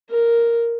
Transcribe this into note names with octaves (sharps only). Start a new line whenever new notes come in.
A#4